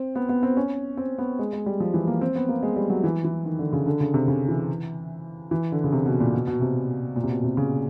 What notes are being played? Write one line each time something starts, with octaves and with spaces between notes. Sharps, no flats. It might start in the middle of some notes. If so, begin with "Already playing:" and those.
Already playing: C4
B3
B3
C4
C#4
C4
B3
G#3
G#3
G3
F3
E3
A#3
C4
B3
A#3
G#3
G3
F#3
E3
E3
D#3
D3
C#3
D3
C#3
C3
C#3
E3
E3
D3
C#3
C3
B2
A#2
B2
B2
C3
A#2
C3
B2
C3
C#3